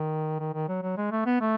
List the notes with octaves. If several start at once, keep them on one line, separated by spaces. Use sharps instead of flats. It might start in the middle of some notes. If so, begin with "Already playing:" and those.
Already playing: D#3
D#3
D#3
F#3
F#3
G#3
A3
B3
A3